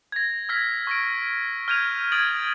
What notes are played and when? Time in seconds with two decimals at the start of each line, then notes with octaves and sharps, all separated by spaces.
0.12 G#6 A#6
0.49 E6 F6 G#6 B6
0.87 C#6 F6 A#6 D7
1.68 F6 G6 G#6 D#7 F7
2.12 D#6 G#6 A6 D7 F#7